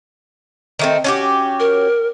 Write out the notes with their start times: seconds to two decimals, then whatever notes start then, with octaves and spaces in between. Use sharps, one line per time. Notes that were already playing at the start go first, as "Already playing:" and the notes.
0.79 D#3 A3 C4
1.04 C#4 F#4 G4
1.60 A#4